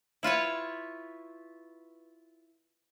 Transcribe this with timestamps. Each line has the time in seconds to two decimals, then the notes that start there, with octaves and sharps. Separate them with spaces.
0.23 E4 F4 B4 C#5